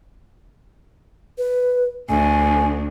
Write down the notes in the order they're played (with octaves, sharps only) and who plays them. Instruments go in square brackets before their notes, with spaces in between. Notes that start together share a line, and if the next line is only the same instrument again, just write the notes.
[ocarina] B4
[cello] D2 [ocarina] G#5